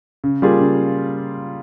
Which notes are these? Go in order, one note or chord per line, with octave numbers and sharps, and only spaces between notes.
C#3
G3 A#3 F4 G#4
C#3